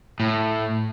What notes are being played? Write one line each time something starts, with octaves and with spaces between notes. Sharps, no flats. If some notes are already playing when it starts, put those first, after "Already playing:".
A2